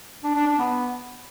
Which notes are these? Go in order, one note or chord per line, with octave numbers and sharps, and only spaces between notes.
D4
D4
D4
B3